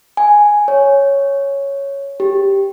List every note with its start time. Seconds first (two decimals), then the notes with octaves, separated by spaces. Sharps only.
0.17 G#5
0.68 C#5
2.20 G4